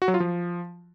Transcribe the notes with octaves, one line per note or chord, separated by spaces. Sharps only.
F#4
F#3
F4
F3